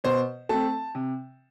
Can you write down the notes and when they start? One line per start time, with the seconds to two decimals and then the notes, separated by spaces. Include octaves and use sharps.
0.04 B2 C5
0.49 A3 C4 A5
0.95 C3